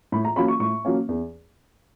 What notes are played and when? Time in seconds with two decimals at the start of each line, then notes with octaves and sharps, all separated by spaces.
0.12 A2 B5
0.25 A#5
0.36 F#3 A#3 C#4 B5
0.48 C#6
0.60 A2 C#6
0.85 F#3 A#3 C#4
1.09 E2